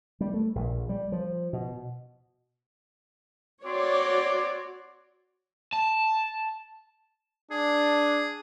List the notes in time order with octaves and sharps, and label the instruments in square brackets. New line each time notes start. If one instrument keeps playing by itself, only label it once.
[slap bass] G3
A3
A#1
G3
F3
B2
[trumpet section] C4 C6 D6 [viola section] F#4 C#5 D5
[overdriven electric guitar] A5
[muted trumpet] D4 [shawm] G#4